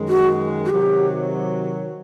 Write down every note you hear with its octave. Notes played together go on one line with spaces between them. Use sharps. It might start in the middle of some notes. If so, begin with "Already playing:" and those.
Already playing: F#2 D#3 G#3
F#4
F#4
C3 D#3 F#3 G4